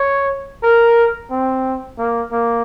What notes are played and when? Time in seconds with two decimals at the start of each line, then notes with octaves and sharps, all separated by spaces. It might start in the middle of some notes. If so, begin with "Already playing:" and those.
Already playing: C#5
0.63 A#4
1.31 C4
1.98 A#3
2.32 A#3